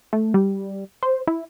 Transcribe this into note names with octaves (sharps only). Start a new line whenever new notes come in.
A3
G3
C5
E4